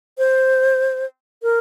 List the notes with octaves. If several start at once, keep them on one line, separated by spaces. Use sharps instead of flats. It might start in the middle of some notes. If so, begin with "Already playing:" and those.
C5
A#4